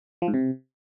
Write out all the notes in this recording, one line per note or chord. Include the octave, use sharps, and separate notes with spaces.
F3
G#2
C3